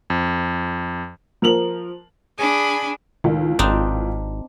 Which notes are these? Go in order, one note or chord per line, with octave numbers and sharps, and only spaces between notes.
F2
F3 A#4 F7 F#7
D4 G#4 G#5 B5
C#2 A2 D#3
G#1 C4 D4 D#4